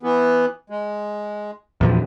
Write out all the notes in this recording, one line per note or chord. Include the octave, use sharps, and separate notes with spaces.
E3 B3
G#3
E2 A#2 F3